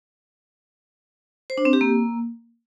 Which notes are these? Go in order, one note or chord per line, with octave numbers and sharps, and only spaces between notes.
C5
D4
C4
G4
A#3